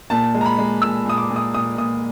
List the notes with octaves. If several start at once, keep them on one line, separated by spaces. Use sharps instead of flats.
A#2 A5
G#3
A#5
B5
G#3
A#2 E6
A#2 D#6
D6
A#2
D#6
A#2 D#6
A#2 D#6